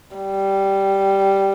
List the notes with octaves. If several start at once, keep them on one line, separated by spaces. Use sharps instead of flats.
G3